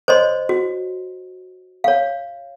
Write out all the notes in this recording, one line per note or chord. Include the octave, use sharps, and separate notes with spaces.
C5 C#5 D#5 C6
F#4
C#5 F5